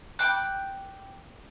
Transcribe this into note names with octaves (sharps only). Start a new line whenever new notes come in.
G5 D6 F#6